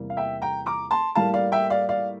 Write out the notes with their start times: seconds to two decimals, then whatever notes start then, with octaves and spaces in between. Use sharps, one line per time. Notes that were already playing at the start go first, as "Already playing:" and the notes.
Already playing: E2 C3 G3 A#3
0.10 F5
0.17 E5 G5
0.42 G5 A#5
0.66 A#5 D6
0.91 A5 C6
1.15 A2 G3 A#3 F5 A5
1.34 D5 F5
1.52 E5 G5
1.70 D5 F5
1.89 D5 F5